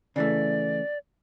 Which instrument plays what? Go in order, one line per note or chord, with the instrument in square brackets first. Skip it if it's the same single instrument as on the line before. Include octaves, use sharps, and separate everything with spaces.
[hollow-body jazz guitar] C#3 E3 A3 [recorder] D5